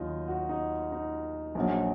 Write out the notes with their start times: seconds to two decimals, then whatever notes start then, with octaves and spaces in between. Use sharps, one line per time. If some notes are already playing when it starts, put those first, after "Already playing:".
Already playing: D#2 D#3 F#3 D#4 F4 F#4
0.28 F#4
0.49 D#4
0.92 D#4
1.55 A#1 A#2 F#3